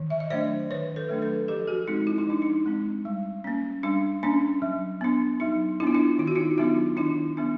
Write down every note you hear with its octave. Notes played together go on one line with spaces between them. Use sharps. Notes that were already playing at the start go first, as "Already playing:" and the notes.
Already playing: D#3
E5
D#5
F#3 A3 D4 C5 D5
D#3 B4 C#5
A4 B4
F#3 A3 D4
A4 B4
F3 G4 A4
F#4 G#4
G#3 C4 D#4
E4
D#4
F3 D4
D#4
G#3 C4
G3
A#3 C#4
G3 D4
A#3 C#4 D4
F#3
B3 D4
F#3 D#4
B3 D4 E4 F4
D4 E4
D#3 F4
F#4
D#4 F4
F#3 B3 D4 D#4 F4
D#3 D4 E4
F#3 B3 D4